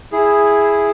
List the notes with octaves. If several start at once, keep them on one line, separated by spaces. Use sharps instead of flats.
E4 G#4